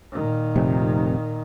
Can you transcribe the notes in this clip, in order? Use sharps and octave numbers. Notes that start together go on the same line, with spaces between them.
A#2 D#3
F1 C3